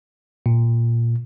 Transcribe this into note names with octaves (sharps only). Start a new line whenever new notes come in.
A#2